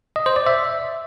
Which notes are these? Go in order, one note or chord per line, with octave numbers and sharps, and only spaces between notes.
D#5
C5
D5
E5